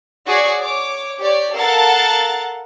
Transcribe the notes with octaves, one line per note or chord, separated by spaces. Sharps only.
F#4 G#4 C#5 D5 C#6
C#5 D6
G4 C#5 D5
A4 A#4 F5 F#5 A6